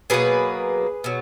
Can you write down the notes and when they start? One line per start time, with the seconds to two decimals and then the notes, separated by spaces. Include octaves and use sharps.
0.10 B2 F#3 A#3 G#4 B4
1.04 B2 F#3